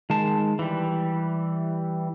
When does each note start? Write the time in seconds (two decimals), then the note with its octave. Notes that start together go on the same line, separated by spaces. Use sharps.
0.10 D#3 G#3 A5
0.59 E3 G3